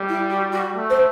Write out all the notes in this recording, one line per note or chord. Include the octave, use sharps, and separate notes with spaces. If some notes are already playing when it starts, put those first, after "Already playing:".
Already playing: G3
E4
F#4
F#4
A3
C5